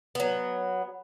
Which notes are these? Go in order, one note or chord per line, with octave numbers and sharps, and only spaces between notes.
F#3 B3